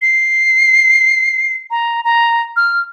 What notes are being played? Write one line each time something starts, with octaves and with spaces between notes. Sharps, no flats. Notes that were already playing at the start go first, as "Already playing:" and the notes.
C7
A#5
A#5
F6